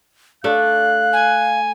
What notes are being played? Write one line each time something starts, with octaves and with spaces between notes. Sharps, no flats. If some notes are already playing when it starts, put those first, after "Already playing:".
A3 D4 F5 F#6
G#5